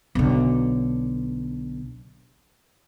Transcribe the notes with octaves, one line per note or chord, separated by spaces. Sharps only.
B1 D3